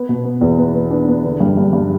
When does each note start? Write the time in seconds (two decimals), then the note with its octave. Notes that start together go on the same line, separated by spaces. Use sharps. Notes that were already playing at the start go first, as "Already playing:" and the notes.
Already playing: B3
0.09 B2
0.25 B3
0.41 E2
0.58 B3
0.74 B3
0.90 D4
1.08 B3
1.24 D3
1.40 G2
1.57 G2
1.73 G2